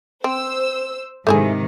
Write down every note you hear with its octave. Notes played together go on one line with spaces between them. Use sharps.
C4 C5 E6
G#2 C3 D#3 A3 E4 G#4